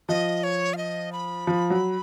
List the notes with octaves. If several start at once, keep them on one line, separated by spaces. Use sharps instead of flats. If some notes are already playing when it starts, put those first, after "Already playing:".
F3 D#5
C#5
F5
D#5
B5
F3
F#3